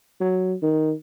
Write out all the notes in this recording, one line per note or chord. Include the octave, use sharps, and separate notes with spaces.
F#3
D#3